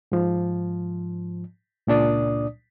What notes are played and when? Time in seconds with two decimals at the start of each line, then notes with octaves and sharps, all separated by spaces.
0.12 G#2 F3
1.87 C#2 A#2 D4 D5 D#6